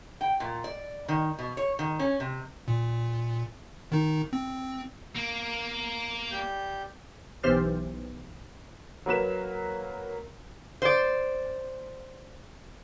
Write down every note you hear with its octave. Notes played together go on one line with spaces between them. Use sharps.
G5
A#2
D5
D#3
B2
C#5
D#3
C#4
C3
A#2
D#3 D#4
C4
A#3
G3 G4 G6
B1 E3 G4 C5 F6 A6
F#3 A#3 B4 E7
C5 D5